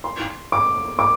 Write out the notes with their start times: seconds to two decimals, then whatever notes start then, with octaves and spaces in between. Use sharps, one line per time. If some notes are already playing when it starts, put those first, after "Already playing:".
0.04 C6
0.52 D6
0.99 D6